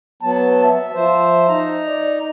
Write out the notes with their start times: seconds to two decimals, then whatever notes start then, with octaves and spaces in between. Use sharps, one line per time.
0.23 F#3 B3 A5
0.64 E5
0.94 F3 C5
1.48 D#4 A#5
1.86 D5